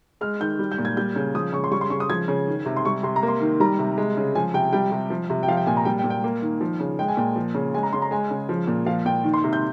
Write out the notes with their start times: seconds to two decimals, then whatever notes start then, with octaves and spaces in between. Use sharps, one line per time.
0.21 G#3 F6
0.40 D#3 G6
0.59 G3
0.72 G6
0.78 A#2
0.85 G#6
0.97 G3 G6
1.16 C#3
1.34 F3 D#6
1.53 C#3 C#6
1.64 C6
1.71 G3 C#6
1.81 C6
1.90 C#3 C#6
2.00 D#6
2.10 F3 G#6
2.28 C#3
2.47 D#3
2.66 C3
2.77 C6
2.85 G3 C#6
3.03 C3 C6
3.16 A#5
3.23 A#3
3.28 C6
3.41 D#3
3.60 G3 A#5
3.79 C3
3.98 G#3
4.17 C#3
4.35 F3 G#5
4.54 C3 G5
4.73 G3 G5
4.92 C3
5.10 F3
5.30 C3
5.43 G5
5.48 F3 F5
5.57 G5
5.67 A#2 G#5
5.77 A#5
5.85 G3 G5
5.99 G5
6.04 A#2
6.10 G5
6.24 A#3
6.42 D#3
6.61 F3
6.80 C#3
6.99 G#3 G5
7.08 G#5
7.17 A#2 G5
7.36 F3
7.55 C#3
7.74 G#3 G#5
7.83 A#5
7.93 C#3 C6
8.02 A#5
8.11 G#3 G#5
8.31 C#3
8.49 F3
8.67 A#2
8.86 F3 F5
9.05 A#2 G5
9.24 D#3
9.34 C6
9.44 C3
9.53 G6